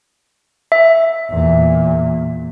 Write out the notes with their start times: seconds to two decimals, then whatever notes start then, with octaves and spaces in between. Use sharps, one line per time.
0.72 E5
1.30 E2 A#2